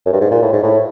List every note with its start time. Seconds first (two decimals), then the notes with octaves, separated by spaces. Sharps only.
0.06 F#2
0.13 G2
0.21 G#2
0.31 A#2
0.42 A2
0.53 G#2
0.63 A2